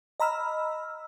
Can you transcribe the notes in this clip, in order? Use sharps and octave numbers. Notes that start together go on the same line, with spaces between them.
D#5 A#5 B5 E6 F6